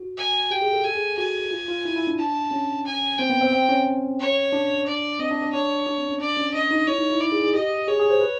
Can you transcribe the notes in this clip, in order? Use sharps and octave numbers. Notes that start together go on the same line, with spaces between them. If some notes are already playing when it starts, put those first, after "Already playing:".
Already playing: F#4
G#5
G4 G5
G#4
A4
A4 G#5
G#4
F#4 G#5
F4
F4
E4
E4
D4
D4 A5
C#4
G#5
C4 G5
B3
C4
C4
C#4
C#5
D4
D5
C4 D#5
D4
D4
D4 C#5
D4
C4
C#4
D4 D5
C#4
D4 D#5
D#4
E4 C#5
D#4
E4
E4 D5
G#4
G#4
G4 D#5
G#4 C#5
G#4
C5
B4